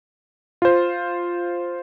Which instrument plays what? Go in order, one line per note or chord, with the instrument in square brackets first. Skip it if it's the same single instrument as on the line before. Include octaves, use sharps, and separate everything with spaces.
[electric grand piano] F4 C5